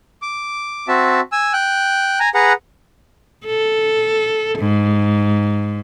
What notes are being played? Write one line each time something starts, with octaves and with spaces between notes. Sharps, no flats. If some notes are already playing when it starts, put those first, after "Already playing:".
D6
C4 F#4 E5 A5
G#5 E6
G5 F#6
G#5 A#5
G#4 B4 F#5 A#5
A4
G#2